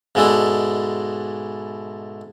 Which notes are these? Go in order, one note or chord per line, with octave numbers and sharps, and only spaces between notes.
G#2 B2 G#3 A3 D4 E4